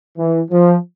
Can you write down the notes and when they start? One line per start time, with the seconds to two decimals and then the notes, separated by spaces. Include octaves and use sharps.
0.17 E3
0.51 F3